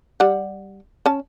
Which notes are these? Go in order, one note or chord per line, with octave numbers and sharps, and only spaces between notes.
G3 F#5
C#4 A5